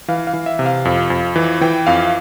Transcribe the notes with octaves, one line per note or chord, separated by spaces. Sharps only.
E3 F5
F5
E3
E5
C3
F5
F2
F2
E3
E3 G5
F2 F5